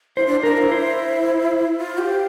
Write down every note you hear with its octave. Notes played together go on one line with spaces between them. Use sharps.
E4 C5
D4
D4 A#4
F4
E4
C5
F4
G4